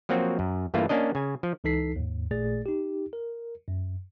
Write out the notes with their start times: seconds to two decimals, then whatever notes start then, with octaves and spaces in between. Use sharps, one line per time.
0.09 F3 F#3 A#3 C4 F#4
0.39 F#2
0.74 G2 E3 A3 A#3 F4
0.89 A#3 C#4 D4 D#5
1.15 C#3 G#5
1.43 F3
1.64 C#2 E3 D#4 A4 B6 C7
1.96 D#2 G#2
2.31 A1 A#2 A3 G#4 D5 A6
2.66 D#4 G4
3.13 A#4
3.68 F#2